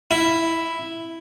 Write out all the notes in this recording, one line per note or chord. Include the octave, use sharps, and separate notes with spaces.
E4